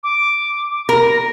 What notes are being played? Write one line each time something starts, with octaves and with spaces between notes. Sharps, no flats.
D6
A#4 A#6